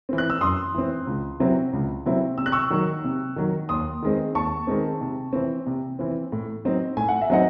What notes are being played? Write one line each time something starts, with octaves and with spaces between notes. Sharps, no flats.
E3 C4
F#6
E6
F#2 C6 D#6
E3 C4
C#2
C3 F#3 C4 E4
C#2
C3 F#3 C4 E4
C3 E6
F#6
C#6 E6
D#3 F#3
C3
D#3 F#3
D#2 C6 D#6
D#3 G#3 C4
D#2 A5 C#6
D#3 G#3 C4
C3
E3 C4
C3
E3 C4
A2
F#3 C4 D#4
A2 G#5
F#5
E5
F#3 C4 D#4 D#5 F#5